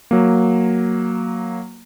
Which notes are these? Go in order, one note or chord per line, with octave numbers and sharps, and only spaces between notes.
F#3 A#3